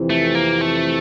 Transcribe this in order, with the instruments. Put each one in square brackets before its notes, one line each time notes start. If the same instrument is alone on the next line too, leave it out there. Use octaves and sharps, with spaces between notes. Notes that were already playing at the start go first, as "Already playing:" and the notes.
Already playing: [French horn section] F2 C3 E3
[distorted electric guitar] A3
A#3
A3